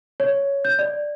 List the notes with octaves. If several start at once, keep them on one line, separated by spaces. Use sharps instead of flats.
C#5
G6
D5